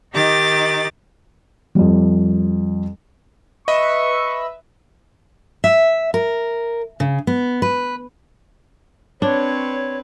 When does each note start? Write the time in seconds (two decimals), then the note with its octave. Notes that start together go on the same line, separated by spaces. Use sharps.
0.13 D#3 D#4 G4 D6 A6
1.75 F2 G3
3.68 B4 D#5 E5 C#6
5.64 E5
6.14 A#4
7.00 C#3
7.27 B3
7.62 B4
9.22 C4 D4 B4 C#5